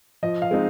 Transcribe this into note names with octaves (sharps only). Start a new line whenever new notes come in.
F3 D#5
F5
G#3 C4 D#4